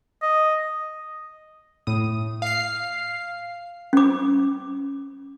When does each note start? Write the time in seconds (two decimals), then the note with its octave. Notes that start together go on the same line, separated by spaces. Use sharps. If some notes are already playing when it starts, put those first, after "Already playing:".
0.22 D#5
1.87 A2 D#6
2.42 F5 C7
3.93 C#4 D6